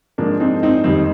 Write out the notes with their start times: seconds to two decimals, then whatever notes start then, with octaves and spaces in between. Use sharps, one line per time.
0.18 G#2 F3 A#3 D4
0.40 C4 D#4
0.63 C4 D#4
0.84 F2 D#3 G3 C4 D#4